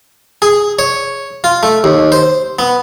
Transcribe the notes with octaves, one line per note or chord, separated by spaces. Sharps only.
G#4
C#5
F4
A3
D#2
C5
B3